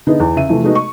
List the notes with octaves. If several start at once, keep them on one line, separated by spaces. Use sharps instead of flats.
D3 B3 D#4 E4 G#4
E2
C#3 E5 D#7
C3 E3 F3 A3
G#3 A3 B3 D#4 F#4 D#5
C#6